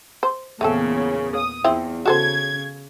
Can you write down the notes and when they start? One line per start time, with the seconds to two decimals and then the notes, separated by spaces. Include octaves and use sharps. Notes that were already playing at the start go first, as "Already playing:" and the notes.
0.23 C5
0.61 E2 A#2 C#3 A3 C4 A4
1.35 D#6
1.64 E2 C4 E4 F4
2.06 C#3 F#4 A4 C5 G#6